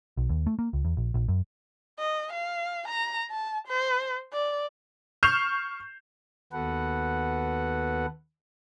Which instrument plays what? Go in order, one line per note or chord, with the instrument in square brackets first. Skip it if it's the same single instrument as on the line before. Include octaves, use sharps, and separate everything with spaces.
[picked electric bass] B1
D#2
A3
A#3
C#2
E2
A#1
A#1
F#2
[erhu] D#5
F5
A#5
A5
C5
D5
[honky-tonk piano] C#6 F6 G6 C7 E7 F7
[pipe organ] D#2 B3 F#4 A4 B4 F#5